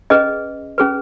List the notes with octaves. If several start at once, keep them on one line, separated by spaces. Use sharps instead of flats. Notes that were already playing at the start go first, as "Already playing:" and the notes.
C#4 G#4 B4 D#5
C#4 G#4 B4